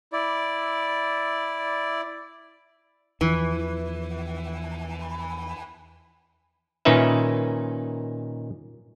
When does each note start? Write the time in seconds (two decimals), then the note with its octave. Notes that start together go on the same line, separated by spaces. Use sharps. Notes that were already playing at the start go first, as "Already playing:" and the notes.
0.13 E4 D5
3.21 E2 E3 F3
6.85 A#2 D#3 C#4 D#4 B4 E5